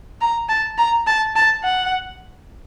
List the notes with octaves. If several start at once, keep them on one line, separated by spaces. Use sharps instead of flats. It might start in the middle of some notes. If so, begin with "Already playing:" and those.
A#5
A5
A#5
A5
A5
F#5